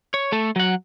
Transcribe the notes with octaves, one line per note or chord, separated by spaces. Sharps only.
C#5
A3 A4
F#3 F#5